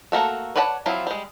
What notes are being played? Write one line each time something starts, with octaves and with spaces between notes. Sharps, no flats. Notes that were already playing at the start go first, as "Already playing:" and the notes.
A3 A#3 F#4 A4
B4 C#5 D5 F#5 A5
F3 F#3 C4 E4 F4
G3 G#3